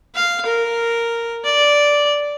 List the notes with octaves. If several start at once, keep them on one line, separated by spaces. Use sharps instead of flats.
F5
A#4
D5